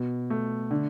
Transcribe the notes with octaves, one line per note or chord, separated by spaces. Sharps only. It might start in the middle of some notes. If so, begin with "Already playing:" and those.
Already playing: B2
A3
D3